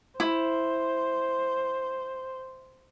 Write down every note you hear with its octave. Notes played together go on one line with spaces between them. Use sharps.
E4 C5